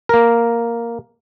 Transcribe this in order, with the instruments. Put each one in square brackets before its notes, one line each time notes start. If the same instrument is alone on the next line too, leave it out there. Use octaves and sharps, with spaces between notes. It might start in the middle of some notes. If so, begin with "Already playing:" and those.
[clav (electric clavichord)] A#3 A#4